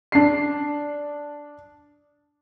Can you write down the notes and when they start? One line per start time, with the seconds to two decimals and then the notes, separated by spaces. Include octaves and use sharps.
0.12 D4 C7